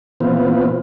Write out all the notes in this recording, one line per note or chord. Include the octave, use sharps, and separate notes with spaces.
A#2 E3 B3 C4 F4